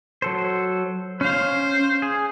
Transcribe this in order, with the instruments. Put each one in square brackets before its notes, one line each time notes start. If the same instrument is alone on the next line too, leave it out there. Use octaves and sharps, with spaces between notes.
[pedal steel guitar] F#3 A4 C5
[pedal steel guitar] C#4 F5 [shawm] C5
[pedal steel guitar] G#4